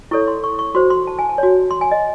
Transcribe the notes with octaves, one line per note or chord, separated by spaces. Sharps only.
E4 A4 C#5 C#6
C6
C#6
C#6
F#4 C5 C6
C6
A5
G#5
A5
F#4 C#5
C6
G#5
D#5